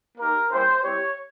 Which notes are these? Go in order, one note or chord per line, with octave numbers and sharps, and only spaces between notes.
A#3 D#4 G4 A#4
G3 A#3 C#4 E4 G4 C5
G3 C4 E4 G4 C#5